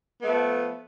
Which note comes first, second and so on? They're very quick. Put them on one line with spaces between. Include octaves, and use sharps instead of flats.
B3 A3 F3